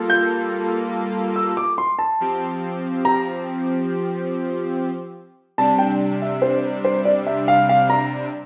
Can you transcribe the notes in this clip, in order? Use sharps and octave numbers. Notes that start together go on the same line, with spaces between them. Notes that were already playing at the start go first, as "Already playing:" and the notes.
Already playing: G3 A#3 F4 A4
G6
E6
D6
C6
A5
F3 C4 G4
A#5
C3 G3 D4 A5
G5
E5
C5
C5
D5
E5
F5
F5
A#5